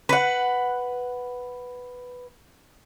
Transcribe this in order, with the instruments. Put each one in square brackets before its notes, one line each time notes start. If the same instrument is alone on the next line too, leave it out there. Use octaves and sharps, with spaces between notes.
[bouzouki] B4 F#5